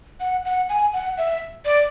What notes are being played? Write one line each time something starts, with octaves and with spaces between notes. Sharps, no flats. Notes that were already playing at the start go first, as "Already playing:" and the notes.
F#5
F#5
G#5
F#5
E5
D5